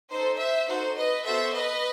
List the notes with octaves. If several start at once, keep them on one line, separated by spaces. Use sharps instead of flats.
D#4 A4 C5
C5 E5
D#4 F#4 A4 C5
B4 D#5
B3 F#4 A4 C5 E5
B4 D#5